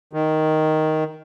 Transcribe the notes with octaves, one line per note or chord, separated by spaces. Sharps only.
D#3